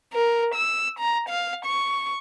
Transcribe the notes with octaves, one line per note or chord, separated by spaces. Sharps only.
A#4
E6
A#5
F5
C#6